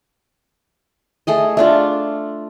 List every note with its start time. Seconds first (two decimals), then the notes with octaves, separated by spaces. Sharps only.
1.27 A3 G#4 D#5
1.57 A3 D4 F4